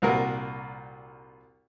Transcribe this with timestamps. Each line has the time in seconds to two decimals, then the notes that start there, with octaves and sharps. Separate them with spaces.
0.02 C2 A#2 F#4 A#4